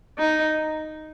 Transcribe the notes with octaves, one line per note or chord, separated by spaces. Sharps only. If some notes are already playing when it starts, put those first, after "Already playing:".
D#4